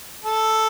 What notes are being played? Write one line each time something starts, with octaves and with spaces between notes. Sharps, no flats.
A4